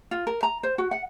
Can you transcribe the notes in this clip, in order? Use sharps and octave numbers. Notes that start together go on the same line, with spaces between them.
F4
A#4
A#5
C5
F#4
F#5